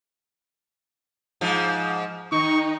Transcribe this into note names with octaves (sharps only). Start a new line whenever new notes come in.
G#2 F3
D#3 D#4 C#6